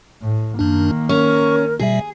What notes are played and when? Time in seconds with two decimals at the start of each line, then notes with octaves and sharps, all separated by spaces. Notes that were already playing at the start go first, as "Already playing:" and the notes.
0.22 A2
0.59 F#2 D#3 A#3 D4
1.09 C#4 A#4 C#6
1.80 B2 G3 G#4 E5